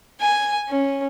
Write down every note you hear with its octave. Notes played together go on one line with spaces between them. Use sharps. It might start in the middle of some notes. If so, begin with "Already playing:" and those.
G#5
C#4